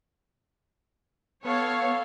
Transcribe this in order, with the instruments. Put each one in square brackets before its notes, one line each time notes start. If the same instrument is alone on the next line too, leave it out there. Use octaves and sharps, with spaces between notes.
[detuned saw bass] B3 [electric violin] A4 F5 [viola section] C#5